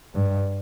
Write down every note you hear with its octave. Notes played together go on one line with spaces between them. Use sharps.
G2